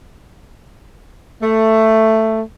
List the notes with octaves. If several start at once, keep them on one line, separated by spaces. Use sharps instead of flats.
A3